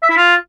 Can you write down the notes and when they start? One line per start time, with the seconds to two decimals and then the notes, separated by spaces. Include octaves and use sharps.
0.03 E5
0.10 E4
0.17 F4